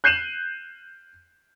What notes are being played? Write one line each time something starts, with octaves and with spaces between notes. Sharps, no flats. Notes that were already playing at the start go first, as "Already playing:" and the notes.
F#6 G6 C7 D#7 E7 F#7